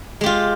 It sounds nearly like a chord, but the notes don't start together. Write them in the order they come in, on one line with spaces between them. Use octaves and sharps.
G#3 G4 F4